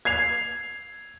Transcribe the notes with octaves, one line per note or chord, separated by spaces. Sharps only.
G#6 C7 F7